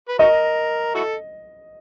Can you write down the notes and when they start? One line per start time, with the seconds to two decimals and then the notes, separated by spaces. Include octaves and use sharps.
0.08 B4
0.19 D#4 F#4 A#4 D#5
0.95 E4 F#4 A4